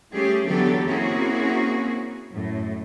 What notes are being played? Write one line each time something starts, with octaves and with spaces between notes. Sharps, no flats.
G3 A3 C#4 G4 G#4
D3 E3 F#3 B3 G4 A4
A#3 C4 C#4 E4 F#4 G#4
F#2 A2